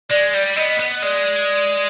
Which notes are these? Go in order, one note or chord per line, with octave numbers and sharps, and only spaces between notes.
G#3 D5
G3
B3 D#5
B3
G#3 D5